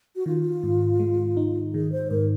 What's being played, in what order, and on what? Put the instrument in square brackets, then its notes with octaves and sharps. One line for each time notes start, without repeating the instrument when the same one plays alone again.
[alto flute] F#4
[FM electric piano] D#3 [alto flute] F4
[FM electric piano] G#2
G#3
D#4
[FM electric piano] D#3 [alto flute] G#4
[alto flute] C5
[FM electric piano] G#2 [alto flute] A#4